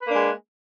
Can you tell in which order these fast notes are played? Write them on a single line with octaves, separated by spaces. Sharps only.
B4 A#3 D4 G#3